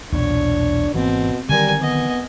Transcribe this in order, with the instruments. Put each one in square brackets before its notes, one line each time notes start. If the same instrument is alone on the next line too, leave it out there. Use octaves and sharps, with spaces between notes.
[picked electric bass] B1 E2 A#2 [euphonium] D4 [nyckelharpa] C#5
[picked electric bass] G#1 E3 A#3 [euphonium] B2 [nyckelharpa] C4
[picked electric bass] D3 D#3 F#3 [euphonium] G3 [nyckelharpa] A#4 G#5
[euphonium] B3 [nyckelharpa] D#5 G#5